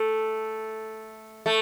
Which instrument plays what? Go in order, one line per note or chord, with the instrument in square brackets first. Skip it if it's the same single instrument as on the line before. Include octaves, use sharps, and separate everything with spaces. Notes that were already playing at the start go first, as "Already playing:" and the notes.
Already playing: [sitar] A3
A3